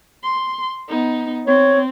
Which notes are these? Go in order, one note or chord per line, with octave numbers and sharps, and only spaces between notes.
C6
B3 D#4
C4 C#5